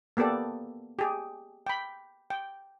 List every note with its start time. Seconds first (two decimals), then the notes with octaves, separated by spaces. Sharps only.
0.17 A#3 B3 G4 A4 D5
0.99 G4 G#4
1.66 G5 B5
2.30 G5